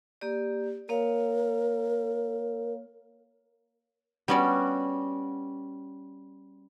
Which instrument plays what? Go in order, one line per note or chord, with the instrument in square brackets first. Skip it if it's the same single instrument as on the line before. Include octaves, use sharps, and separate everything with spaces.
[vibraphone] A#3 G4 D5
[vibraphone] A#3 C#5 F5 [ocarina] A#4
[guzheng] G3 B3 C#4 F#4 D5